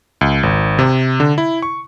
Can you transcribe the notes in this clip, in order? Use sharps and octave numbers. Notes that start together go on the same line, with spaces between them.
C#2
G#1
C3
D3
E4
C#6